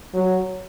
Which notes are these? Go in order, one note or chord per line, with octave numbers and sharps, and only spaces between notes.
F#3